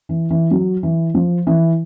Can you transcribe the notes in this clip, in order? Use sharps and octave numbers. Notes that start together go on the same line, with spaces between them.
E3
E3
F#3
E3
F3
E3